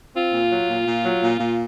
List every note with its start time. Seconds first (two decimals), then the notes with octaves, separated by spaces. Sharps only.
0.15 C4 F4
0.33 A#2
0.51 F#3
0.69 A#2
0.87 A#2
1.04 F#3
1.23 A#2
1.40 A#2